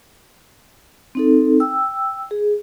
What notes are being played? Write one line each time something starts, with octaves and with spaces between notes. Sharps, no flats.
C4 D#4 A4
G5 E6
G#4